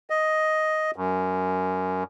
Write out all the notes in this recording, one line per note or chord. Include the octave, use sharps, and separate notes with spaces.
D#5
F#2